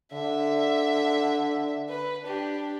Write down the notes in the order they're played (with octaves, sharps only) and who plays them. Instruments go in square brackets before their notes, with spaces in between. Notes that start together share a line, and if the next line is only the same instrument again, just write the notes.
[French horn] D3 [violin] E5
[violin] B4
D4 G4